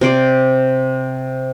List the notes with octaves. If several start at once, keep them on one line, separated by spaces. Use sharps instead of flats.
C3 C5 D5